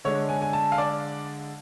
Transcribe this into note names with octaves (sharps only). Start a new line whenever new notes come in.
D3 G#3 D4 C#5
G#5
G#5
A5
F5
D5